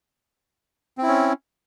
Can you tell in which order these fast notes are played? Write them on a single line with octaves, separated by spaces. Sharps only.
C4 E4 C#4